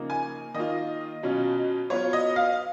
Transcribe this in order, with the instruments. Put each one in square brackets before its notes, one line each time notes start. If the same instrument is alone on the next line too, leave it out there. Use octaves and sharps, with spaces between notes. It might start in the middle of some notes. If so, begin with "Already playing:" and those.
Already playing: [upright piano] C#3 F3 A#3 D#4
G#5
D#3 A#3 F4 D#5
B2 F#3 C#4 F4
F#3 B3 F4 C#5
D#5
F5